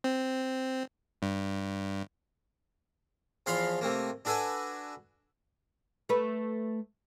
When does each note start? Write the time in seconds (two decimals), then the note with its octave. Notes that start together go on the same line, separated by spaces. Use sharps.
0.04 C4
1.22 G2
3.46 E2 F3 C#5 F5 B5 C6
3.81 C3 A3 A#3
4.25 D4 F#4 A4 B4 G#5
6.09 A3 B4